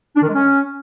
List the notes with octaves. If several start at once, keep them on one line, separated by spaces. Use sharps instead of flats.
D4
D#3
G#3
C#4